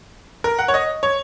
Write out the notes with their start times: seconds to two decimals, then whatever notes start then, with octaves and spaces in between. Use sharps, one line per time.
0.44 A#4
0.59 F#5
0.68 C#5
0.74 D#5
1.03 C#5